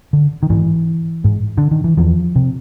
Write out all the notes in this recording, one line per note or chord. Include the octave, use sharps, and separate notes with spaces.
D3
D#3
G#2 E3
G#2
D3
D#3
E3
E2 F3
C3